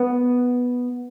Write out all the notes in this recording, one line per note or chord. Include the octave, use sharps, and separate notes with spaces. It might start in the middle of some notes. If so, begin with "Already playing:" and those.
Already playing: B3